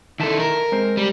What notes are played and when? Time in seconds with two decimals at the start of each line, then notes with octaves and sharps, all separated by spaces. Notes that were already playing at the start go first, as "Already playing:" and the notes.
0.20 D#3 E4 A4 E5 A5
0.40 A#4
0.72 G#3 C4 C5
0.97 G3